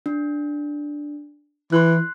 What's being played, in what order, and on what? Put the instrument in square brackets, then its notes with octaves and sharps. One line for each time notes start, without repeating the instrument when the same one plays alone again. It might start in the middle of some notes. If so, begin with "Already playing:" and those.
[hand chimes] D4
[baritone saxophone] E3 [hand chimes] C6 F#6